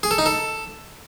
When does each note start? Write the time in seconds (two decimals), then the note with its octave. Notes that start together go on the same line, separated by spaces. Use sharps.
0.03 G#4
0.11 A4
0.18 D#4
0.26 A4